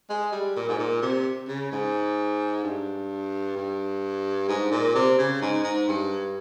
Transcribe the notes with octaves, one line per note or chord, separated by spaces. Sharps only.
G#3
G3
A#2
G#2
A#2
C3
C#3
G#2
G2
G2
G#2
A#2
C3
C#3
G#2
G#2
G2